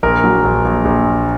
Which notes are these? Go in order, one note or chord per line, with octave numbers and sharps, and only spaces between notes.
A#1 A#4
F#3
A#1
A#1
A#1
A#2